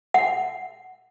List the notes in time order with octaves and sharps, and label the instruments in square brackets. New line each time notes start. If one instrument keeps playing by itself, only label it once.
[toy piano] F#5